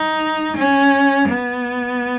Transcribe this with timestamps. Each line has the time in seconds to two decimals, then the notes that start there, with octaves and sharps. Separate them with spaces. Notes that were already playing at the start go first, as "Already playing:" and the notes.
Already playing: D#4
0.57 C#4
1.29 B3